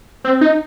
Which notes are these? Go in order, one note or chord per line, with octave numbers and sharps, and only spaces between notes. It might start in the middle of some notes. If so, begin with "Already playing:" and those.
C4
D#4